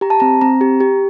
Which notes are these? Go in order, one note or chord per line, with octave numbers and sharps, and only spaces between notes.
G4 A#5
A5
C4 A#5
C4 A#5
G4
G4